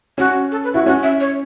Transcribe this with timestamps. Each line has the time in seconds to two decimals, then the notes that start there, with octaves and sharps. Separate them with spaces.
0.18 C#4 F#4
0.51 A4
0.64 B4
0.74 E4 F#4
0.86 C#4 F#4
1.03 E5
1.20 C#5